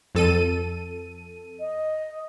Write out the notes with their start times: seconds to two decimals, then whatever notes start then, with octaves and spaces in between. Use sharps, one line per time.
0.15 F2 A4 D#7
1.60 D#5